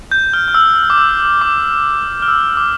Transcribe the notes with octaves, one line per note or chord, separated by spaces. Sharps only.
G6
F6
F6
E6
D6
E6
D6
F6
E6
D6